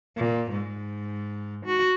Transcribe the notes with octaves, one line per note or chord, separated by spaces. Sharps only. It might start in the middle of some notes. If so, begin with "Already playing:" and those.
A#2
G#2
F#4